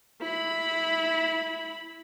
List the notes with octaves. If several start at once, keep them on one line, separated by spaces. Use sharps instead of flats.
E4 B5